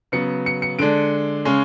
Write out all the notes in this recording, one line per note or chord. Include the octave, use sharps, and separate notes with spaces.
C#3 F#3 B3 C#7
C#7
C#7
D3 G#3 D4 D7
C#3 G#3 C#4